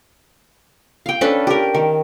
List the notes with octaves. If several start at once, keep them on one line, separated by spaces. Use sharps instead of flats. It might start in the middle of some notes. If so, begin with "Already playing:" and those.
F5 G5
C#4 D4 A4 B4
G4 A#4
D#3